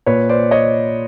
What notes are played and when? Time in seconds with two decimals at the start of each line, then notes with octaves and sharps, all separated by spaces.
0.06 A#2 B4 C#5
0.29 C5 D5
0.51 C#5 D#5